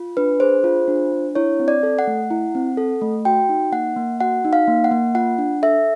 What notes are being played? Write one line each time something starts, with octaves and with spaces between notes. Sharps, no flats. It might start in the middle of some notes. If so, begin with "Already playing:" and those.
Already playing: F4
D4 B4
G#4 C5
F4
D4
D4
E4 C#5
C4
D5
A4
F#5
A3
E4
C4
A4
A3
F#4 G5
D#4
A#3 F#5
A#3
F#4 F#5
D#4
F5
A#3
F#5
A#3
F4 F#5
D4
A4 E5